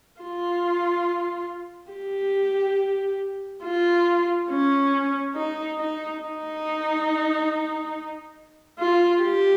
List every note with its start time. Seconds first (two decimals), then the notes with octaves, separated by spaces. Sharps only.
0.21 F4
1.92 G4
3.64 F4
4.50 C#4
5.36 D#4
5.79 D#4
6.21 D#4
8.79 F4
9.22 G4